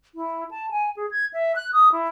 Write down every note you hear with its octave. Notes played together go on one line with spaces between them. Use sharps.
E4
A5
G#5
G#4
G#6
E5
F#6
D#6
E4